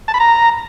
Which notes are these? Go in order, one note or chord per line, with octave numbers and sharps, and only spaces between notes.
A5
B5
A#5